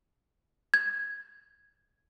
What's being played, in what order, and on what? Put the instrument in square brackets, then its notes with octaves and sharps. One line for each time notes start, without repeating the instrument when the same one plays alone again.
[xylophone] G#6